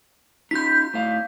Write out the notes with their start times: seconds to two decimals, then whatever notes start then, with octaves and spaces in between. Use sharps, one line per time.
0.51 D#4 F4 G6 B6
0.94 A2 F5